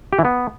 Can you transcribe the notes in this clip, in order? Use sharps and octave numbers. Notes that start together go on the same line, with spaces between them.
G4
E3
B3